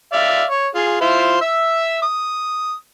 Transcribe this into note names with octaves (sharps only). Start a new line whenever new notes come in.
D5 E5 F5
C#5
F4 G#4
E4 F4 C5
E5 E6
D#6